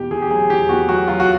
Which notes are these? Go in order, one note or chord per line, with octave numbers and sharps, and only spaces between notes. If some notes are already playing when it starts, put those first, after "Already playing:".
Already playing: E2 B2 G4
E2 G#4
G4
F#3 G#4
E2 G4
E2 F#4
F#3 F#4
F#3 F4
F#4